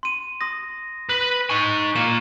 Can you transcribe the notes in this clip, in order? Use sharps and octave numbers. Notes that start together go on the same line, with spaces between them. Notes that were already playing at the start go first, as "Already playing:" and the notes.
C6 D#7
C6 D#6 A#6
B4 F#6
D#4 G#5 C#6
A#3 F4 E7